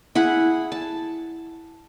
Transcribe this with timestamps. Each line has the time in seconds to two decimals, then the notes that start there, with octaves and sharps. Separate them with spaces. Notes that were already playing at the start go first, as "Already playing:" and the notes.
0.15 E4 G#4 F#5
0.72 A5